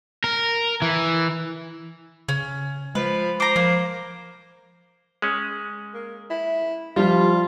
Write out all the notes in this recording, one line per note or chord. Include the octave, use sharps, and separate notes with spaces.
A#4
E3
C#3 C#4
F3 G#3 B4
C5 A#5 D6
F3 A#3
G#3 C#4
A#3
E4
F3 G3 F4